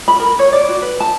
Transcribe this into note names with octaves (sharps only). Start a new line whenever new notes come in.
B5
A#4
C#5
D5
F#4
B4
A5